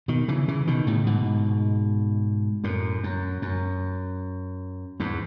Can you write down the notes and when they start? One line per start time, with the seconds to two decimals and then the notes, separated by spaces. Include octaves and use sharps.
0.08 B2 D#3
0.28 C#3 E3
0.48 C#3 E3
0.67 B2 D#3
0.87 A2 C#3
1.06 G#2 B2
2.64 F#2 A2
3.04 F#2
3.42 F#2
5.00 E2 G#2